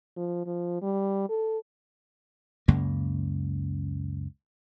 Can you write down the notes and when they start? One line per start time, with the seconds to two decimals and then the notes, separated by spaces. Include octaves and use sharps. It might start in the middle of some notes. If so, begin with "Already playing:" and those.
0.17 F3
0.46 F3
0.82 G3
1.29 A4
2.68 C#2 F#2 C#3 A#3